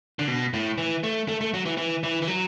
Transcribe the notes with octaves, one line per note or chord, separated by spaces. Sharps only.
D3
B2
A2
E3
A3
A3
A3
F#3
E3
E3
E3
E3
F#3